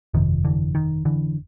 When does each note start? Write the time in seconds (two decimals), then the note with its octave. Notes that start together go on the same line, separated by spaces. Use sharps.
0.14 G1 F2 C3 D#3 F3
0.45 D3 E3
0.75 D#3
1.05 D3 E3